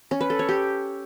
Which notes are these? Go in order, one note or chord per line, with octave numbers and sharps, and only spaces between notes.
C#4
B4
A4
C#5
G4